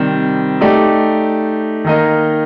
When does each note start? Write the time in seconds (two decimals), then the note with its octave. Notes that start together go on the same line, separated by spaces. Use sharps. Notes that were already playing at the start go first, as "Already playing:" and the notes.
Already playing: C3 D#3 G3 C4
0.61 A3 D#4 G4 D5
1.84 D#3 A#3 D#4 A#4 D#5